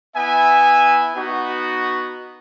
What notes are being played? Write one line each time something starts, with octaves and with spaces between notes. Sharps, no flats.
B3 E4 E5 G#5
B3 D#4 F#4